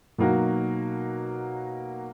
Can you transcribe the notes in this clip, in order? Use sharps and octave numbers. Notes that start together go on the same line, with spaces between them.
B2 F#3 A#3 D#4 F#4